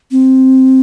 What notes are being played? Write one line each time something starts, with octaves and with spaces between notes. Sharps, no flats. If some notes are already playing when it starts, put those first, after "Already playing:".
C4